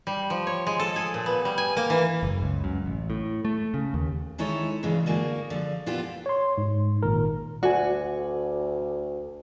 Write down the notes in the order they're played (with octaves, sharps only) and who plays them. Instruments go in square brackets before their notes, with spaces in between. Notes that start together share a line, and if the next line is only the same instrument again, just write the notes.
[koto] G3
F3
C#5
G#3
A4
G#4
A#2
B3
G3
G#5
A#3
E3
[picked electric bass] F#1
C#2
F#2
A1
A2
A3
C#3
D#2
[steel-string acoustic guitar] D#3 G#3 D#4 E4 A4 C#5
G2 C#3 E3 G3 G#3
D3 A#3 F#4 G#4
D3 F3
A#2 B3 F4 G4 A4
[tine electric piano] C#5 C6
G#2
G#1 A#2 D#3 A#4
[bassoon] D2 [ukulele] F#4 [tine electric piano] D5 G#5